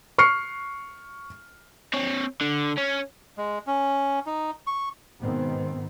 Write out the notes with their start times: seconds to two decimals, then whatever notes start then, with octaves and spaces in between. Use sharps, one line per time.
0.18 C#6 F6 C7 C#7
1.94 C4 C#5
2.41 D3
2.78 C#4
3.37 G#3
3.67 C#4
4.26 D#4
4.67 C#6
5.20 G#2 B2 D#3 B3 C4